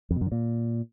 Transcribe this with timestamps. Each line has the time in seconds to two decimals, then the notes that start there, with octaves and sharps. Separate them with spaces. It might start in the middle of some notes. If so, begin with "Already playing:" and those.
0.11 F2
0.16 B2
0.21 F#2
0.26 D3
0.32 A#2